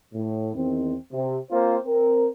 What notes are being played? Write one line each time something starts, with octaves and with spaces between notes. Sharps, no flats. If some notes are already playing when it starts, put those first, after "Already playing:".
A2
E2 D#3 C4
C3
A#3 C4 F4 C5
C4 A#4